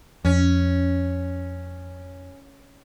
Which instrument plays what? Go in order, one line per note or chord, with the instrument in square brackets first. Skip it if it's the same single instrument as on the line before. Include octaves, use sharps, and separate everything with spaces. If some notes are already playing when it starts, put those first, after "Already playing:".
[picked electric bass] F2 [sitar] C#4